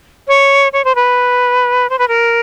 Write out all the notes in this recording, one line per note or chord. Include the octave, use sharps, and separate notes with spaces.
C#5
C#5
C5
B4
C5
B4
A#4